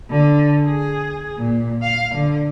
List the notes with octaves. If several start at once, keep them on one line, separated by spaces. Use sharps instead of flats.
D3
G#4
A#2
F5
D3